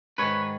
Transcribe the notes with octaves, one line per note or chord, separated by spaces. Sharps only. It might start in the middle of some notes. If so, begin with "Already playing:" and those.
G#2 D#3 B4 C#5